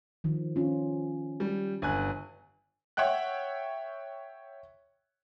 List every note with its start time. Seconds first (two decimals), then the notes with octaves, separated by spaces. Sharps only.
0.24 D#3 F3
0.56 C#4 F4
1.40 G3
1.82 G1 G#5 F#6
2.97 C#5 E5 F#5 G5 F#6